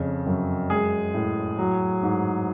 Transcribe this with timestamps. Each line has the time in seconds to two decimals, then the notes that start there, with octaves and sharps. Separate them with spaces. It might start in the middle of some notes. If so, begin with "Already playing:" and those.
Already playing: F2 C#3
0.27 F#2
0.70 G#3 G#4
1.14 A2
1.58 F#3
2.03 G#2